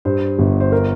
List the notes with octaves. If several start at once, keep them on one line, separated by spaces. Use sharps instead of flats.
G2 C5
G1
C5
A#4